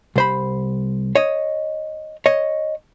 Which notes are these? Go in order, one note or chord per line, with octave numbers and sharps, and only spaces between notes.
C2 C5 B5
C#5 D#5
C#5 D#5